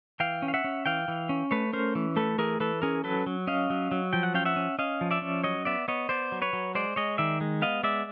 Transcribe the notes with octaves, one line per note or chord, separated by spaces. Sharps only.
E3 F5 G5
C#4
F5
E5 F#5
C#4
E3 F5 G5
E3
C#4
A3 B4 C#5
C#4 A#4 C5
E3
A3 A4 B4
E3 G#4 A#4
E3 A4 B4
C#4 G#4 A#4
F#3 A4 B4
F#3
C#4 D#5 F5
F#3
F#3
F3 G5
F#5
C#4 F5 G5
E5 F#5
C#4
C#4 D#5 F5
F3
D5 E5
C#4
F#3 C#5 D#5
B3 D5 E5
B3 C#5 D#5
B3 C5 D5
F#3
B4 C#5
F#3
G#3 C5 D5
G#3 C#5 D#5
D#3 D5 E5
G#3
B3 D#5 F5
G#3 D5 E5